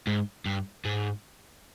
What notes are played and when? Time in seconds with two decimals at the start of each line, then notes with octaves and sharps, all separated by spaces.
0.07 G#2
0.46 G2
0.85 G#2